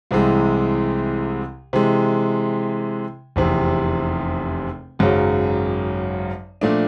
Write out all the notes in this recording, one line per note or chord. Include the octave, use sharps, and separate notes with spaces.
C2 C3 E3 G#3
C3 E3 G#3
F1 E2 C3
G#1 F#2 C#3 F#3
A#2 F3 A3 D4